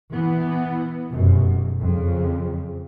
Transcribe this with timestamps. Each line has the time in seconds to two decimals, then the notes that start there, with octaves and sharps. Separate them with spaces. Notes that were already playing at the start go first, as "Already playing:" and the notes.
0.13 E3 B3
1.10 F1 F#2 B2
1.81 F2 C#3